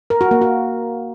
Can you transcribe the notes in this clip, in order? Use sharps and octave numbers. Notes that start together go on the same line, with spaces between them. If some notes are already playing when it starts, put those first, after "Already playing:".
A#4
F#4
A#3
F#4